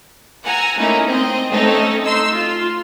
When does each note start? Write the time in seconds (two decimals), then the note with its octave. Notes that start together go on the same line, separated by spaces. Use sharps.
0.44 F#5 G#5 A#5 E6
0.78 A3 A#3 C#4 D#4 E4
1.07 C4 D#5
1.51 A3 C4 C#4 D#4 A4
2.04 D#4 C6 E6
2.34 F4